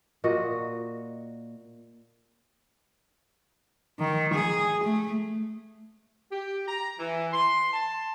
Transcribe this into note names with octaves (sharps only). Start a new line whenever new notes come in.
A#2 F#4 D#5
D#3
G#4
A3
G4
A#5
E3
C6
A5